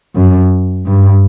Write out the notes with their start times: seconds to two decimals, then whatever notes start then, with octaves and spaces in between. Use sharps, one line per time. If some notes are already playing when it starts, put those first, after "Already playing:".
0.16 F#2
0.86 G2